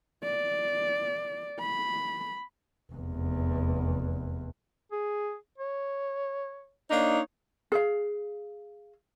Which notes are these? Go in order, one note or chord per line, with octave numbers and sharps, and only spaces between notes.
D5
B5
F1 E2
G#4
C#5
A#3 D4 D#4 C#5
G#4 F5